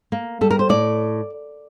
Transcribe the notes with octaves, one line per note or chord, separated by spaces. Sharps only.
A#3
G3 A4
A#4
C5
A2 D5